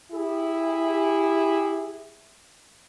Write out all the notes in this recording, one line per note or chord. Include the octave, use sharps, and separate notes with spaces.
E4 G4 G#4